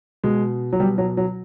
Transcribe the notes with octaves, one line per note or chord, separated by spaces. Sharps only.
B2 G#3
F#3
B2 G3
F#3
F#3